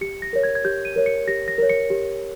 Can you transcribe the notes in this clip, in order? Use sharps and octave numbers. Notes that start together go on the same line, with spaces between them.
G4 C#7
A#6
A#4 C#5
G#6
G#6
G4 G6
D#7
A#4 C#5
C#7
G4 A#6
A#6
A#4 C#5
C#7
G4